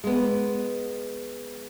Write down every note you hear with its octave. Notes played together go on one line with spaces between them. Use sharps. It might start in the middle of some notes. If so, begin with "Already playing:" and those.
G#3 B3